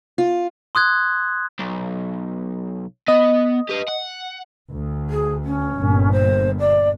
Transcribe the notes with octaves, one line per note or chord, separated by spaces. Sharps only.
F4
C6 D#6 F#6 G#6
B1
B3 D#5
G4 B4
F#5
D2
G#4
C#4
G1 G2 A#2
C5
D5